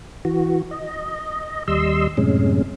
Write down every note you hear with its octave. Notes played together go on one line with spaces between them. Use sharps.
E3 F#4
D#5
D#2 G3 D#5 C6 E6
F#2 A2 C3 G#3 C#4